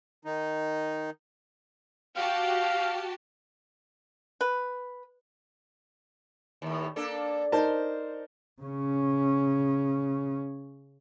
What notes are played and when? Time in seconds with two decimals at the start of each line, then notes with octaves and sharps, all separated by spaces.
0.25 D#3 D#4
2.16 F#4 G4 F5 A5
4.41 B4
6.62 D#2 A2
6.96 A#3 D4 A4
7.52 D#4 A#4 C5 A5
8.62 C#3 C#4